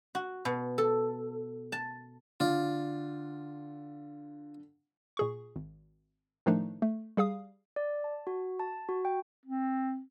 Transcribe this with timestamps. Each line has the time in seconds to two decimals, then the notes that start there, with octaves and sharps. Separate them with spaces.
0.15 F#4
0.45 B2
0.78 A4
1.72 A5
2.40 D3 F4 D5
5.17 A#2 G#4 C#6
5.56 G#1
6.46 A2 D#3 F3 A3 D4 D#4
6.82 A3
7.17 G3 G#4 F5 D#6
7.76 D5
8.04 A5
8.27 F#4
8.60 A5
8.89 F#4
9.05 G5
9.45 C4